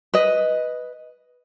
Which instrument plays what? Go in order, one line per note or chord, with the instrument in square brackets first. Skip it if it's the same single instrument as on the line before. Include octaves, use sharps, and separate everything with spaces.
[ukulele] B4 D#5